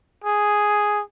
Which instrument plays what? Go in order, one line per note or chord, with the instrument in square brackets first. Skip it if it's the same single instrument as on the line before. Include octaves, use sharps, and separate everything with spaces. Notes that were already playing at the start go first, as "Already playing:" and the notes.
[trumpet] G#4